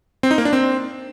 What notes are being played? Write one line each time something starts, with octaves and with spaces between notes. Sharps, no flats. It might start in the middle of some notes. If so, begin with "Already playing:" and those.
C4
D#4
A#3
D4
C4